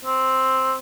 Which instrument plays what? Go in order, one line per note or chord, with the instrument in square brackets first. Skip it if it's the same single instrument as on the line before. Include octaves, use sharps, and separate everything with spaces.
[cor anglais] C4